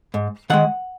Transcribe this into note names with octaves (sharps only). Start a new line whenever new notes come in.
G#2
D#3 G#3 F#5